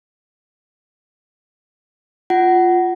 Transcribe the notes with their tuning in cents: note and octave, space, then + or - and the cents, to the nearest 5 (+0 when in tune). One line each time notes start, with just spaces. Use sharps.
F4 +0 F#5 +20